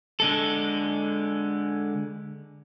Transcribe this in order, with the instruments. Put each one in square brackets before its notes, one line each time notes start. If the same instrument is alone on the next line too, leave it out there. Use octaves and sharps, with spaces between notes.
[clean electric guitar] D3 G#3 A4